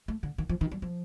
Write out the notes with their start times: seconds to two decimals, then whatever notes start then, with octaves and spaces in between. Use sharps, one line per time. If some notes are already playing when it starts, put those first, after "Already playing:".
0.08 A3
0.23 D3
0.38 D#3
0.49 F3
0.61 D#3
0.72 G3
0.82 F3